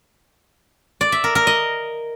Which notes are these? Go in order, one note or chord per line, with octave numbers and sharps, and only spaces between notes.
D5
E5
A#4
A#4
D#5